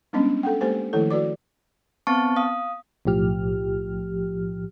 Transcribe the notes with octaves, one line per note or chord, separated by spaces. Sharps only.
G3 G#3 B3 C#4 D4 D#5
A4 F#5 G5
G#3 A#3 G4 A4 C5 G#5
D#3 F3 A3 E4 A4
F#4 B4 D5 D6
B3 C4 A5 C#6
F5 D#6
B1 A2 F3 G4 F6